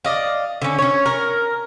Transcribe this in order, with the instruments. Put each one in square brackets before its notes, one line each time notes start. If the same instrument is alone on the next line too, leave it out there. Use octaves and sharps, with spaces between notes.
[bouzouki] D5 D#5 F5
D3 C#4
C#4 C#5
A#4